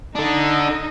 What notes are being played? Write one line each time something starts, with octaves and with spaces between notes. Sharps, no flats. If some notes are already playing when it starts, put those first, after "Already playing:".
D3 D4 D#4 D#5